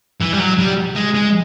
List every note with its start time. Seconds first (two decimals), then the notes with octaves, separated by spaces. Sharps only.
0.21 E3
0.33 G3
0.39 F#3
0.59 G3
0.96 G#3
1.15 G#3